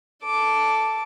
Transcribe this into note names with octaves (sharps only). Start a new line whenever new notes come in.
A4 D6